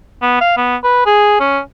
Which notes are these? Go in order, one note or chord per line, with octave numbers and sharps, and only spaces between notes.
B3
F5
B3
B4
G#4
C#4